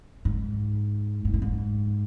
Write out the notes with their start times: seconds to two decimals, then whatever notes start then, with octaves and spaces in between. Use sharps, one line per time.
0.25 G#2
1.25 G#2
1.34 A2
1.42 G#2